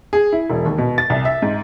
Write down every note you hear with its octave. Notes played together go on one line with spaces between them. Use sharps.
G#4
E4
E1
D#2
B2
A6
C2
E5
G#2